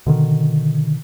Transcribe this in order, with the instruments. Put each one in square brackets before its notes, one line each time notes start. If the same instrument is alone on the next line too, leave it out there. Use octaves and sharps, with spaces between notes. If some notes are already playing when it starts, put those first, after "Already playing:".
[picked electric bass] B2 D3 D#3